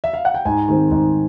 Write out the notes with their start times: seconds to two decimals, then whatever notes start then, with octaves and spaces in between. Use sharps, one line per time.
0.04 E5
0.14 F5
0.25 F#5
0.34 G5
0.45 G#2 G#5
0.68 D#3 G#3 C4
0.91 G#2